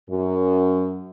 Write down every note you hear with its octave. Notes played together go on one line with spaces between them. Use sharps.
F#2